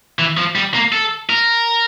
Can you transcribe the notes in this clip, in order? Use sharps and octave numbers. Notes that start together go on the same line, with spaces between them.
E3
F3
G3
A#3
A4
A#4